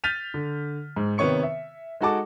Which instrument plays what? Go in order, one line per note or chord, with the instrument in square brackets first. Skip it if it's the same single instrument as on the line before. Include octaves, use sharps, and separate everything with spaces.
[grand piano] F6 G6 A6 B6 D#7 F7
D3
G#2
C3 D#3 B3 C#5 C#6 C#7
E5
G#3 D#4 F#4 A4 A5 D6